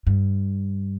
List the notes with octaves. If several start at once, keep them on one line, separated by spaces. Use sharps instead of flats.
G2